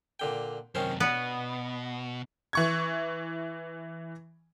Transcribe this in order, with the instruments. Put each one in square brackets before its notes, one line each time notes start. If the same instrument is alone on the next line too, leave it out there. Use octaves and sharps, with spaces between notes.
[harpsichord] A#2 D3 G5
[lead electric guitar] F#2 C3 [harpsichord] D#3 C#4 C5
[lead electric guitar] B2 [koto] B3 [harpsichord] D5
[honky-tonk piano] E3 C#6 G#6